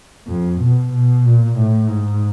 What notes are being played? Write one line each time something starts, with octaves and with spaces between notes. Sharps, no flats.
F2
B2
B2
A#2
A2
G#2